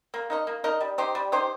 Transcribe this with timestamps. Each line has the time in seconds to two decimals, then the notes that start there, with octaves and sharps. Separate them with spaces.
0.14 A#3
0.30 D#4 A#4 D#5
0.47 A#3
0.64 D#4 A#4 D#5
0.81 G3
0.98 D#4 G4 C5
1.15 G3
1.32 D#4 G4 C5